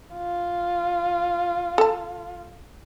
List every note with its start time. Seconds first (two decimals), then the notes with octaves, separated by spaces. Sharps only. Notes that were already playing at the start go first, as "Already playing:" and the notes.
0.16 F4
1.78 A4 A5